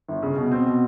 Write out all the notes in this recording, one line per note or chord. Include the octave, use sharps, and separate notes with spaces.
G1
C#3
B2
C4
B2